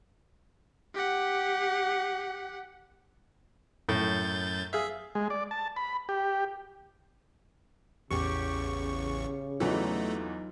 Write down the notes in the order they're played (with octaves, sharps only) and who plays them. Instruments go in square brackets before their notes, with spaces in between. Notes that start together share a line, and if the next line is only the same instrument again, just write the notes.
[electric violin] G4 F#5
[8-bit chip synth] F#2 G6 A6 [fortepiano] A2
[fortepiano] G#4 F5 [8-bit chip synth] E5
[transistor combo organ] G#3
D5
A5
B5
G4
[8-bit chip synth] A1 E2 C#6 [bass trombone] C#3 [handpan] G4
[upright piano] E2 E3 [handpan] F#3 D#4 F4 [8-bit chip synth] A3